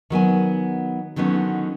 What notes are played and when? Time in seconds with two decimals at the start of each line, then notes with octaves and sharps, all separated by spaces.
0.10 D#3 F#3 B3 G#5
1.16 D3 D#3 F#3 B3 C#4